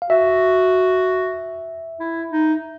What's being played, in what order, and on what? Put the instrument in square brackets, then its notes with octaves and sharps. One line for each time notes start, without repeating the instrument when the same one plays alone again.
[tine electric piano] F5
[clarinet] F#4 [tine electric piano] E5
[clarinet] E4
D#4